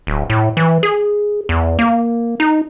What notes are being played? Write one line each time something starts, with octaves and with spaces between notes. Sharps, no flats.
D1
A2
E3
G#4
E2
A#3
D#4